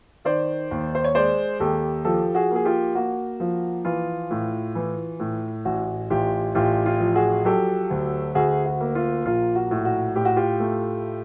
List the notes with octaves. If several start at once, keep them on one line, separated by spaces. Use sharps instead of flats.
D#3 C5 D5
D#2
C5
C#5
G#3 C5 D5
D#2 G4 A4
F3 G4 A4
F#4 G#4
A#3 G#4
F4 G4
A#3 F#4
F3
E3 F4
A2
E3
A2
A1 F#4
A1 F4 G4
A1 F4 G4
F4 G4
F3
F#4 G#4
F#3 G4 A4
D2
D2 F#4 G#4
F#4
A#3
F4
A#1 F4
F#4
A2
F#4
A2 G4
F#4
F4 G4
A3